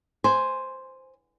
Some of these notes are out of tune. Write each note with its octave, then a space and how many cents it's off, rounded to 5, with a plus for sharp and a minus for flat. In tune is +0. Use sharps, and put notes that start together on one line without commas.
C5 +0 G#5 +0